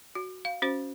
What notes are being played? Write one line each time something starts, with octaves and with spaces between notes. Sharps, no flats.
F#4
F5
C#4 F#4 C5